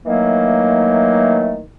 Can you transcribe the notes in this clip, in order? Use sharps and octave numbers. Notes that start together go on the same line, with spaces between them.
D#3 E3 F#3 A3 A#3